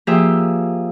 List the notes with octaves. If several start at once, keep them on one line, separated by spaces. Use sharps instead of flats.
F3 A#3 F4 G4 G#4 E5